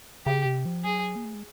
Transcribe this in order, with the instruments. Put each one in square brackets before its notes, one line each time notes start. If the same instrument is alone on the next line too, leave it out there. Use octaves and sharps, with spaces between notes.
[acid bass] C#3 [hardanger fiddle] G4
[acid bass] C3
F3
[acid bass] F#3 [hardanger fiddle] G#4
[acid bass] A#3
A3
G#3